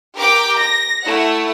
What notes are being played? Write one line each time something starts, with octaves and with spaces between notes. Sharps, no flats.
G4 A#4 G5 D6
A#6
A3 E4 F#5